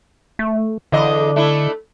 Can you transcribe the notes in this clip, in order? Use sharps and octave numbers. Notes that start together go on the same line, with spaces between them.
A3
E2 D3 D4 D#5
A3 D4 E4